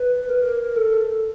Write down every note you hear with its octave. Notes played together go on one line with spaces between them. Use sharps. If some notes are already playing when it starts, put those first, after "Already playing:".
Already playing: B4
A#4
A4